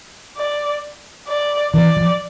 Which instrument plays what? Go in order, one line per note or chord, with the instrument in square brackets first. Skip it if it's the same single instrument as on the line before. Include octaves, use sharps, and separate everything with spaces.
[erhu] D5
D5
[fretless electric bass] E3 [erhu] D5
[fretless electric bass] F3